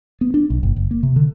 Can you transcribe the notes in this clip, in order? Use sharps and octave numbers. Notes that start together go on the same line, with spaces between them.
B3
D4
B1
F#1
F#1
A#3
C3
D3